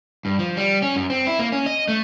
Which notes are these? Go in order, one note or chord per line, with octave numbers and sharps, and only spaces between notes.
G2
F3
G3
C#4
F#2
C4
E4
A#3
C#4
D#5
A3